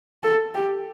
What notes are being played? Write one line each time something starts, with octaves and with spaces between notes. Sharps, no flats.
A4
G4